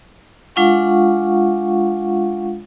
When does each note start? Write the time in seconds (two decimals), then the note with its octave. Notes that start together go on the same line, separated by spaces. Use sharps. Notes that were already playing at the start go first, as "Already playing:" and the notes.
0.56 G#3 D4 F4 F5 F#5 C#6